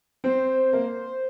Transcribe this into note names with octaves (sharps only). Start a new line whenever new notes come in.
C4 C5
A#3